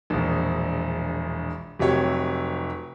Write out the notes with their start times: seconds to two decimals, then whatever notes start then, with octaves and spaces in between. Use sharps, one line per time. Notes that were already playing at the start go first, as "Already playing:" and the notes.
0.10 E1 A#1
1.79 F1 C3 F#3 G4 C#5